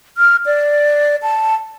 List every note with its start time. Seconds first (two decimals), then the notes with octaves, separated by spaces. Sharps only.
0.17 F6
0.46 D5
1.23 A5